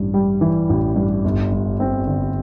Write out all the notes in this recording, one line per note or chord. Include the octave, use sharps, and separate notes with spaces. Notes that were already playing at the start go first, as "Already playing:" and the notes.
Already playing: A1 G2
G3
E3
A1
G2
G1
G2
C4
D3